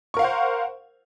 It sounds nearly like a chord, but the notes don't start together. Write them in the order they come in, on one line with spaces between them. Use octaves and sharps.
C#6 A#4 F5 F#5 C5